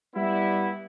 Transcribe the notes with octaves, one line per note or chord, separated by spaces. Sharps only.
G3 B3 E4